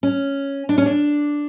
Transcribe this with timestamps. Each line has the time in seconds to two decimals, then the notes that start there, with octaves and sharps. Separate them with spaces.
0.03 C#4
0.69 D4
0.78 C#4
0.86 D4